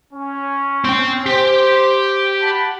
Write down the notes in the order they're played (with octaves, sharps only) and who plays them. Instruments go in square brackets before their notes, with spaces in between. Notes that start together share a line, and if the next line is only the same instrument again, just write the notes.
[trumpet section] C#4
[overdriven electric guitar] C4 G5
[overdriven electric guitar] G4 [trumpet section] C5
[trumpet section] F#5 A5 B5